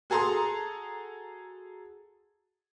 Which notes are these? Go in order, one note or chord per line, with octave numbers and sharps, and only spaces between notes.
F#4 G#4 A4 A#5 C6 D#6